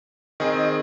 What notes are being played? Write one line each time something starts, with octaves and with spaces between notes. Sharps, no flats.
D#3 C4 G#4 D#5